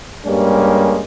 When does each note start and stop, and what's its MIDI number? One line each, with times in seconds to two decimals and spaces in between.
0.25 1.01 43
0.25 1.01 55
0.25 1.01 56
0.25 1.01 58
0.25 1.01 61